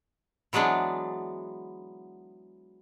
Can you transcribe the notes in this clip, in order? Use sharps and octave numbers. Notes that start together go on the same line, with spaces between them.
E3 F#3 G#3 B3 D4